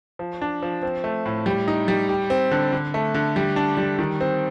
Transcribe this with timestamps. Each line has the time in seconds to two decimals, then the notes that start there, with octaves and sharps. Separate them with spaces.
0.19 F3
0.41 D4
0.63 F3
0.82 C4
1.04 A3
1.26 A2
1.46 G3
1.68 D#4
1.88 G3
2.09 G4
2.30 C4
2.51 D3
2.72 D3
2.94 A3
3.14 D3
3.36 G3
3.56 D4
3.77 G3
3.99 D#3
4.21 C4